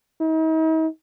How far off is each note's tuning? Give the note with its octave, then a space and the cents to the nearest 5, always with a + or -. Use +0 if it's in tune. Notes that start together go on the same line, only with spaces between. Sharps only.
D#4 +45